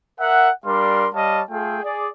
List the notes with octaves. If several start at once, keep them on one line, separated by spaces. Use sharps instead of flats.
A#4 E5 F#5
G3 D4 A#4 F5 C6
G3 C#5 D#5 F5 A5
A3 F4 G#4 A4 G5
G#4 D5